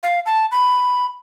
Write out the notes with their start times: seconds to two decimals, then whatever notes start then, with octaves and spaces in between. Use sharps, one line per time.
0.03 F5
0.26 A5
0.52 B5